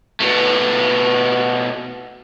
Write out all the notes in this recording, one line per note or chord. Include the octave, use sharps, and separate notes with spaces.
B2 A3